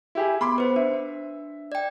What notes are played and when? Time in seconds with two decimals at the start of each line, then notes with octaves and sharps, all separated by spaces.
0.15 E4 G4 G#4
0.41 B3 B5 C6 D6
0.58 B3 B4 C5
0.76 D4 E5
1.72 D5 G5